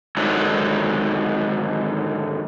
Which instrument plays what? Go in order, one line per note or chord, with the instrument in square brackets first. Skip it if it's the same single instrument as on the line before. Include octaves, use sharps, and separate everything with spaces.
[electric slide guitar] G#2 D3 D#3 F#3